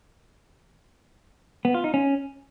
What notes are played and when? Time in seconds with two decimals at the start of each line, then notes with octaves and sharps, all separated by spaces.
1.65 B3
1.74 F4
1.84 D#4
1.94 C#4